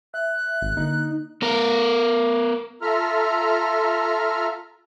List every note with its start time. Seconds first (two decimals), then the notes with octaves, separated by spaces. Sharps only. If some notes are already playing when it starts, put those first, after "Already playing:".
0.14 E5 F#6
0.62 G#1
0.77 D3 A#3 D#4
1.42 B3 A#4
2.82 F4 A4 E5 A#5 F6